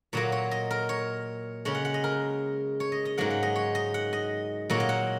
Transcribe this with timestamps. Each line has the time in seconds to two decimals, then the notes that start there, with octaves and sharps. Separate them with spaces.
0.13 A#2 F#3 A#3 C#5
0.32 C#5
0.51 D#5
0.71 A#4
0.89 C#5
1.65 C#3 G#3 C#5
1.75 F#5
1.85 F#5
1.94 D#5
2.04 A#4
2.80 C#5
2.92 D#5
3.05 D#5
3.18 G#2 F#3 A#3 F#5
3.30 F#5
3.43 D#5
3.56 C#5
3.75 D#5
3.94 F#5
4.13 D#5
4.70 A#2 F#3 A#3 C#5
4.80 D#5
4.89 F#5